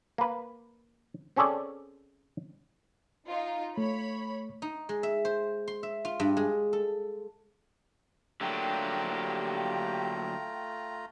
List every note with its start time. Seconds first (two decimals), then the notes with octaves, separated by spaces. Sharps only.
0.18 A#3 B4
1.36 C4 C#4 G#4 A4 D5
3.27 D#4 F4
3.78 A3 C#5 B5
4.62 D#4
4.89 G#3
5.03 E5
5.25 C5
5.68 C6
5.83 E5
6.05 F4
6.20 G2
6.37 G#3
6.73 A4
8.41 D3 F#3 A3 A#3 F4 G4 G5 A#5